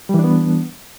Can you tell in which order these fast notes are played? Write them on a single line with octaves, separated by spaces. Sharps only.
G3 E3 D4 B3